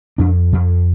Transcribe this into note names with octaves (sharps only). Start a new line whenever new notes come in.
F2 D4
F2